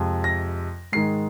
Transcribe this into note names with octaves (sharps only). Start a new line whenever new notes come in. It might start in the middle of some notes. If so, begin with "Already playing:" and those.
Already playing: F2 C3 F3 G#3
A#6
G#2 D#3 G#3 C7